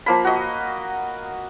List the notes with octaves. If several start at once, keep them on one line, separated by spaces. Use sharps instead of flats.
F3 A#3 B5
F#4 D#5